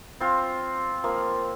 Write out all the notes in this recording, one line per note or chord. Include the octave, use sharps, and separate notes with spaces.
C4 F4
F3 A#3